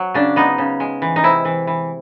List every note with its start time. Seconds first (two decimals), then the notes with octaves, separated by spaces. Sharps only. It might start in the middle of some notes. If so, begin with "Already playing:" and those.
Already playing: F#3
0.14 C#3 D4
0.36 B3 D#4
0.58 C#3
0.80 G#3
1.02 E3
1.16 D#4
1.24 C3 E4
1.45 E3
1.67 E3